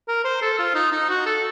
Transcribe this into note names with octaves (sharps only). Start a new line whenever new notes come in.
A#4
C5
A4
F4
D#4
D#4
F#4
A4